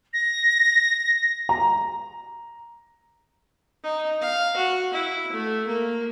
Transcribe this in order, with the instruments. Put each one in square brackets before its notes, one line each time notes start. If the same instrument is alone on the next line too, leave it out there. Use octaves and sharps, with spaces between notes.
[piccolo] A#6
[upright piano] A#5
[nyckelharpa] D#4
F5
F#4
E4
A3
A#3